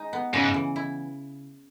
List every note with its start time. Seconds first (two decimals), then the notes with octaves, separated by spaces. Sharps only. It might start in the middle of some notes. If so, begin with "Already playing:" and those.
Already playing: G#3 D#4
0.13 B3
0.34 G#2 C#3
0.54 E3
0.76 E4